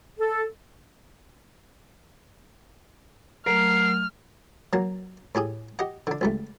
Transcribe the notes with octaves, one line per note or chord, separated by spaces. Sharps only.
A4
F#3 A3 A#4 F6 C7
F#3 A#3 A5
A2 G4 G#4 D#6
G4 D#5 F#5
D3 D4
C#2 G3 A3